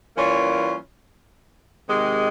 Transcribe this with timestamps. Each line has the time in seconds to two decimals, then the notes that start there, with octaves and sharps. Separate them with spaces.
0.15 E3 G3 A#3 C#4 F4
1.87 C3 D#3 G#3